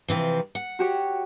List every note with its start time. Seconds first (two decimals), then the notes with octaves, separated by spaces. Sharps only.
0.08 C3 E3 F3
0.55 F#5
0.79 F#4 G4 C#5